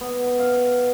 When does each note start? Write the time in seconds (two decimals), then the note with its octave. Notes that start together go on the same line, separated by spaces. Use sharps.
0.01 B3
0.39 F5